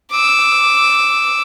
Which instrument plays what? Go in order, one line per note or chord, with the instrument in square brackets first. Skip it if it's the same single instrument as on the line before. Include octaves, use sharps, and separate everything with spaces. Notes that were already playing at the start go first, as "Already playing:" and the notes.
[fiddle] D6 E6